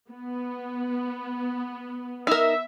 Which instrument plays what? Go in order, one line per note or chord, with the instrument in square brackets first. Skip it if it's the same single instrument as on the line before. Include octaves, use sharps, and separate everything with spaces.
[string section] B3
[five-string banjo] D#4 A#4 [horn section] E5